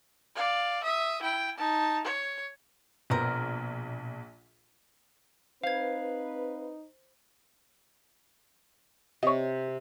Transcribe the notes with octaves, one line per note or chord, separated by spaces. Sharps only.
D5 F5
E5 D#6
E4 G5
D#4 A5
C#5
A#1 B2 B3 C4 A#4
C4 D#4 B4 C5 F5 G#6
C3 C#5 D#5